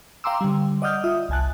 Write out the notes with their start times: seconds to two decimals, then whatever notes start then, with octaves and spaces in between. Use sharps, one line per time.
0.24 F5 G5 A#5 C6 D6 E6
0.41 D3 G3
0.82 D5 D#5 F#5 D#6 F6 G6
1.04 F4 E5 D#6
1.29 G1 C2 G#5 A5 F#6